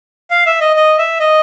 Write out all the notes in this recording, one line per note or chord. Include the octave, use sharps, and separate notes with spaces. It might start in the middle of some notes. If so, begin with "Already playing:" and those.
F5
E5
D#5
D#5
E5
D#5